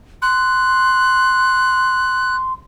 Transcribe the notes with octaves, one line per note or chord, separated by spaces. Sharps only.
C6 F#6